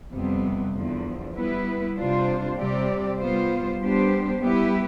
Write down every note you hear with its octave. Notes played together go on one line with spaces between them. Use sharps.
F2 C3 G3 B3
E2 D3 F3
G3 B3 E4 B4
C3 G3 D4 F4 C5
C3 G3 C4 G4 D5
G3 B3 F4 C5
G3 B3 D4 G4 C5
G3 B3 E4 G4 B4